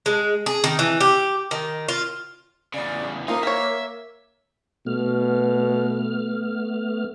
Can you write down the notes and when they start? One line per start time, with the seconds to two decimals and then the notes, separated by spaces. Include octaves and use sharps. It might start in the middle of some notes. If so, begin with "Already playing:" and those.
0.06 G#3
0.46 G#4
0.64 D#3
0.79 E3
1.00 G4
1.51 D#3
1.88 F4
2.74 E2 C#3 D5
3.28 D#3 F3 A#3 D#4 F4
3.43 A#4 C#5 E5
4.86 B2 A3 B3 F6